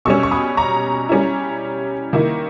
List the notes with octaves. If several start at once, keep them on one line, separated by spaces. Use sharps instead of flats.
B2 G3 C#4 C#6 E6
C#6
B5 D#6
A#5 C#6
G3 C#4 E4
D#3 A#3 E4